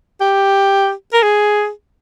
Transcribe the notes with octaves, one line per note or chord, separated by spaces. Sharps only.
G4
A#4
G#4